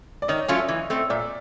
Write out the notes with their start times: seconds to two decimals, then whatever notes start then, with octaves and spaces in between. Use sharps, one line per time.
0.22 D5
0.28 D#3 C#5 D#5
0.48 F#3 A3 C#4 F4
0.69 E3
0.90 A3 C4
1.10 A#2 D5 E5